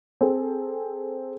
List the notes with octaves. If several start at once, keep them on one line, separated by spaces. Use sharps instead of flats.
C4 G#4 A4